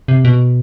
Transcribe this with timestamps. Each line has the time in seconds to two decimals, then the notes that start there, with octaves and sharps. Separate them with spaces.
0.08 C3
0.25 B2